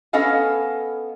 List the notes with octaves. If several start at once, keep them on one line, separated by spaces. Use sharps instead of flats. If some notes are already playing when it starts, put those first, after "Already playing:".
B3 C#4 A4 D#5 F5 G#5